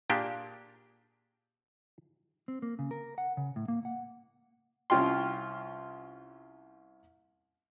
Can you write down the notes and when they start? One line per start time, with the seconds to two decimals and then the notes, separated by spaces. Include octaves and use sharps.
0.10 A#2 A#3 D4 G4 G#4
2.48 C4
2.62 A#3
2.79 C#3
2.91 A#4
3.18 F#5
3.37 C#3
3.56 A2
3.68 A#3
3.85 F#5
4.90 C2 C#4 F4 G5 C6